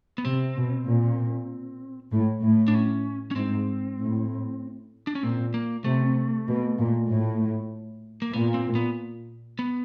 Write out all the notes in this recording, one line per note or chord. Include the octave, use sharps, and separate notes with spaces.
B3
C3 C4
B2
A#2
A2
A2
D4
C#4
C#4
G#2 C4
A2
D4
C#4
A#2 C4
A#3
C3 A3
B2
A#2
A2
A#3
A#2 B3
C4
B3
B3